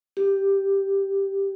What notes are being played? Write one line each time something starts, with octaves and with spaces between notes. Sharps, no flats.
G4